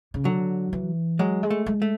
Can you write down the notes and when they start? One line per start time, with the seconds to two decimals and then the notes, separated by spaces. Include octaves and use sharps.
0.14 C#3
0.25 D3 F#3
0.73 E3
1.19 F#3 G#3
1.43 G#3
1.50 A3
1.66 G#3
1.82 A3